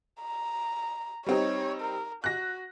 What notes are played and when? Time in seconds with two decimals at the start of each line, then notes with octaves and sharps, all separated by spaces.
0.21 A#5
1.26 G3 C4 D#4 C#5
1.82 A#4
2.24 F#4 F#6 A#6